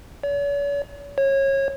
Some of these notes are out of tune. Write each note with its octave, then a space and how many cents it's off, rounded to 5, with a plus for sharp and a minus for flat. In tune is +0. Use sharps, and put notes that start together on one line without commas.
C#5 +45
C#5 -25